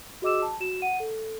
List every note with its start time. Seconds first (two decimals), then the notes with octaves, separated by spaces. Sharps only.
0.22 F#4 G#4 D#5 D6 E6 E7
0.42 A5
0.60 F#4 E7
0.82 F#5 D#7
1.00 A4